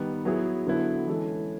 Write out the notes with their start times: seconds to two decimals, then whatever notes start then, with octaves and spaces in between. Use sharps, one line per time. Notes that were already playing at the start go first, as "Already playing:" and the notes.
Already playing: D#3 G3 B3
0.25 F#3 B3 E4 G#4
0.67 D3 F#3 B3 E4 A4
1.08 E3 G#3 C#4 E4 A4